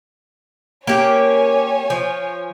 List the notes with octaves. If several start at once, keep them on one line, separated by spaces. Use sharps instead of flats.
A#3 C#4 G4 C#5 G#5
F3